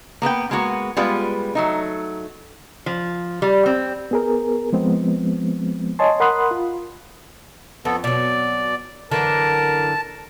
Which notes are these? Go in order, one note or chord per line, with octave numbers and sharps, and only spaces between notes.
A#3 B3 B4 G5
G#3 A#3 B3 F#4
G3 G#3 B3 F4 B4
F#3 A3 D#4
F3
G3
C4
B3 G#4 A#4
F3 G#3 B3 C4
C#5 D#5 G#5 A5 C6
A#4 F#5 B5 C6 D#6 F#6
F4
F2 B3 A4
B2 F#3 D5
F#2 D3 E3 A#4 A5